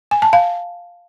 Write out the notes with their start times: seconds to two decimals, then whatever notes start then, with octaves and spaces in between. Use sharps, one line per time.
0.11 G#5
0.22 A5
0.33 F5